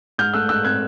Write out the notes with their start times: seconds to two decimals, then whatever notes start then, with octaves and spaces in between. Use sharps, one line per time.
0.18 G#2 F6 G6
0.34 A3 E6 F#6
0.49 G#2 E6 F#6
0.64 C4 F#6 G#6